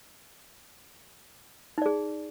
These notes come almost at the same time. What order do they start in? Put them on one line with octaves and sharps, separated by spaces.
D#4 D5 G#4